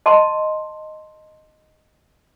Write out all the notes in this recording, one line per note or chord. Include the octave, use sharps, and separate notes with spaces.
D#5 A5 C6